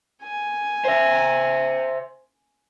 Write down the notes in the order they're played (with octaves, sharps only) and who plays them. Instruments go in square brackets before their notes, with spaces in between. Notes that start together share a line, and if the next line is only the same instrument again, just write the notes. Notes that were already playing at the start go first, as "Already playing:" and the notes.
[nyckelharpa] G#5
[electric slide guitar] C5 E5